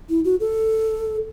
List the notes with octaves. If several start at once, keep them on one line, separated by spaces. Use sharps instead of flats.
E4
F#4
A4